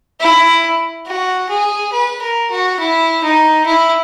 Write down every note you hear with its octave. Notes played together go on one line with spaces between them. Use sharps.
E4
F#4
G#4
B4
A#4
F#4
E4
D#4
E4